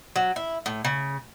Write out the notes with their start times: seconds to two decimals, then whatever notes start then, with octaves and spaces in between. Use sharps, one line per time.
0.16 F#3
0.36 E4
0.66 A2
0.85 C#3